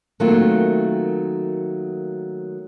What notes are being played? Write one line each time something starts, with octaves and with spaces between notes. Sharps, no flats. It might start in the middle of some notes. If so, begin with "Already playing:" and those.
D#3 F#3 A3 A#3 C4 F4